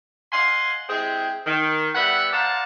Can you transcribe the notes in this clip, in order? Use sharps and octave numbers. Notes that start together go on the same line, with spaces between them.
D#5 F5 F#5 G#5 C6
G#3 C4 E4 G4 G#4
D#3
G3 B3 E5 F#5 B5
C5 D5 F5 F#5 A5 A#5